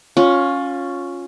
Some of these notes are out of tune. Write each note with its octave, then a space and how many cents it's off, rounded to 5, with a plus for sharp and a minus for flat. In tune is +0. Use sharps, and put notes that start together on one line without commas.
C#4 +0 F4 +20